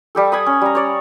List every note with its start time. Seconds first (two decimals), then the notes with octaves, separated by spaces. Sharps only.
0.15 G3 G4 A4
0.32 G#5 B5 D#6
0.46 C#4
0.61 G3 A#5
0.75 C#5 D5